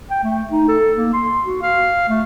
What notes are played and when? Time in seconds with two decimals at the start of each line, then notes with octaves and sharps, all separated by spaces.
0.10 G5
0.23 A3
0.51 D#4
0.68 A4
0.97 A#3
1.13 C6
1.45 F#4
1.62 F5
2.09 A3